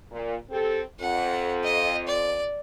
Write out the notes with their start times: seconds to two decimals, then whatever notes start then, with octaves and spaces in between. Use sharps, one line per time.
0.11 A#2
0.50 C4 G4 A4
1.00 F2 F#5
1.64 D#5
2.07 D5